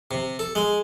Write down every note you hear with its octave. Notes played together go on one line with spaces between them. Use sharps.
C3
A4
G#3